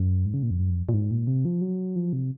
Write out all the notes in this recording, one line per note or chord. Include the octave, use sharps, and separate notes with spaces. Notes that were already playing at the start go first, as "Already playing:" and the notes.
Already playing: F#2
G#2
C#3
A#2
F2
F#2
F2
A#2
G#2
A#2
C3
F3
F#3
F3
C3